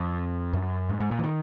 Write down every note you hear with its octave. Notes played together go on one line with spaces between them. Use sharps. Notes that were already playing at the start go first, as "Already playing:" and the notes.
Already playing: F2
F#2
G#2
G#2
A#2
E3
D#3